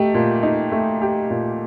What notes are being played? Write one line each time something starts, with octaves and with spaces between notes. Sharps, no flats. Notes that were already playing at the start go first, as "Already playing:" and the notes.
Already playing: A3 D#4 G4
A#2
D#4
A3
G4
A#2